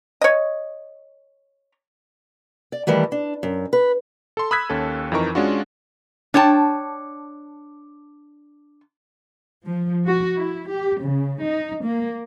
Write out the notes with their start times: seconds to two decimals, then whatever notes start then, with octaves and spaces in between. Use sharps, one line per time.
0.21 C#5 D#5
2.72 D5
2.87 D#3 E3 G3 A3
3.12 D4
3.43 F#2
3.73 B4
4.37 A4 C6
4.51 B5 D#6 E6 F#6 G#6 B6
4.70 D#2 C#4 A4
5.12 F2 E3 D#4 A#4 C#6
5.35 G#3 C#4 D4 F4 F#4
6.34 D4 C#5 G5 A5
9.67 F3
10.05 F#4
10.38 E4
10.71 G4
11.03 C#3
11.45 D#4
11.87 A#3